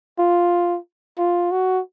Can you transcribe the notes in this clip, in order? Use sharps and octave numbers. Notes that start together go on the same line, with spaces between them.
F4
F4
F#4